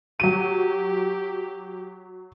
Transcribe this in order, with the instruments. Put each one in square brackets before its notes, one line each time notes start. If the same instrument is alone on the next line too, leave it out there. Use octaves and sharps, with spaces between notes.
[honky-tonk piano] F#3 D#7 [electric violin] G4